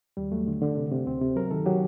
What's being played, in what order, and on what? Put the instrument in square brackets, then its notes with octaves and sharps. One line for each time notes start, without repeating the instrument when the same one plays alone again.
[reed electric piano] D#2 G3
F#3 A3
D3
D3
C3
C3
D2 C4
C3
F#3 A#4
D#3 A4
F#3 G4